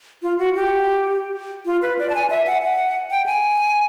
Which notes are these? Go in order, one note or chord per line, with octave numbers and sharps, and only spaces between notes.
F4
F#4
G4
F4
B4
D5
A5
G#5
E5
F#5
F#5
G5
G#5